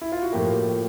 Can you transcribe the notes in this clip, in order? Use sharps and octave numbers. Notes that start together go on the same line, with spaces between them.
E4
F4
F#4
A2 F3 A#3 G4